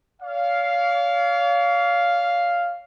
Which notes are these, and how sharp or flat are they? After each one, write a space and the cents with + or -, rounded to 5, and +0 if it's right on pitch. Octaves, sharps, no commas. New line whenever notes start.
C#5 +45 F5 +0